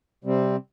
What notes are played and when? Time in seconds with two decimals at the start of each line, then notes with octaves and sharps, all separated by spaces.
0.24 C3 G3 C4